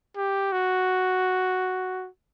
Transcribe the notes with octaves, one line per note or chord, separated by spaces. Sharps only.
G4
F#4